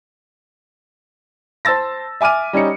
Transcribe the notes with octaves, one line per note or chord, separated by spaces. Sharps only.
C5 A5 E6 A6 A#6
E5 G#5 D6 F6 D#7
G3 C#4 D#4 C#7